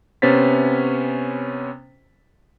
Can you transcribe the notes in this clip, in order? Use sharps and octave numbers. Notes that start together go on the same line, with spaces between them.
C3 B3 C#4 C5 A6 B6